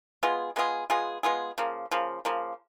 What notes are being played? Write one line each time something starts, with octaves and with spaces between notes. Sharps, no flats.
G#3 B3 F4 G#4
G#3 B3 F4 G#4
G#3 B3 F4 G#4
G#3 B3 F4 G#4
C#3 F3 A#3
C#3 F3 A#3
C#3 F3 A#3